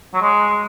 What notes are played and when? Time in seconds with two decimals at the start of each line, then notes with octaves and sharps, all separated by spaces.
0.14 F#3
0.22 G#3